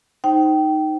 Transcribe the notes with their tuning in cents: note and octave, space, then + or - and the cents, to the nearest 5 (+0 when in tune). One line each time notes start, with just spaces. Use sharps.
D#4 +0 C5 +0 G5 -20